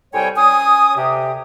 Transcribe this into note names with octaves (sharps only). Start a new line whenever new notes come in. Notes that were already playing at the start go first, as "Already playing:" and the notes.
C2 A2 G3 C#5 G5 G#5
C#4 G#5 D#6
D2 C3 G4